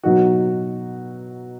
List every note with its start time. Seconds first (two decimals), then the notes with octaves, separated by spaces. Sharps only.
0.03 B2 F#3 D#4 F#4